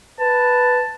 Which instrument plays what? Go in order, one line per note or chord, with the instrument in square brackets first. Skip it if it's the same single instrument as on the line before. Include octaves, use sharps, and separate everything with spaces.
[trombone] B4 [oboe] A5